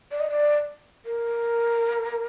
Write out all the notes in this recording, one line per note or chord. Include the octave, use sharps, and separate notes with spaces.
D5
D#5
D5
A#4